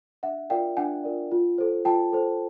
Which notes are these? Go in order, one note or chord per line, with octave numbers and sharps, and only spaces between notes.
D4 E5 F#5
F4 A#4 D5 F5 G5
D4 F#5 G#5
F4 A#4 D5
F4
A4 C5
F4 G5 A5
A4 C5